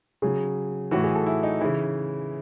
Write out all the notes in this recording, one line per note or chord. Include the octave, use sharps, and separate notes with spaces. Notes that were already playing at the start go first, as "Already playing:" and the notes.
C#3 F#3 G#4
A2 E3 F#4
G#4
A4
E4
D#4
C#3 E3 E4